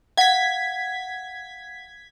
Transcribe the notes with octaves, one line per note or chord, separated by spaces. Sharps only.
F5 F#5 G#6 B6